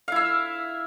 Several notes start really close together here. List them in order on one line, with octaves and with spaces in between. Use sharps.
F5 E4 E5